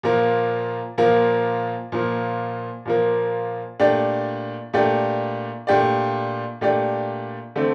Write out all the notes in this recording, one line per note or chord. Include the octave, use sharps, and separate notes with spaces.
A#2 F3 A#3
A#2 F3 A#3
A#2 F3 A#3
A#2 F3 A#3
A#2 A3 D4 G4 D5
A#2 A3 D4 G4 D5
A#2 A3 D4 G4 D5
A#2 A3 D4 G4 D5
D3 A3 C4